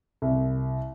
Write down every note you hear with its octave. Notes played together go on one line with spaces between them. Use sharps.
C2